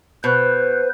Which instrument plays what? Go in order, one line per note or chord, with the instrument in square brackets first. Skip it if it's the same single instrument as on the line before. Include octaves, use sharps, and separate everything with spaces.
[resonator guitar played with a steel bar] B2 [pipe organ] B4 C5